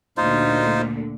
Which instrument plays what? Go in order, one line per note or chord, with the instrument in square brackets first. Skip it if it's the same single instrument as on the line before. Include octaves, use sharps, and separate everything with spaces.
[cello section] D2 A#2 D3 [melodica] D#4 F4 C5